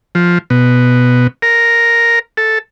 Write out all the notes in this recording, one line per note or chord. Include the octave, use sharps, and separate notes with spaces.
F3
B2
A#4
A4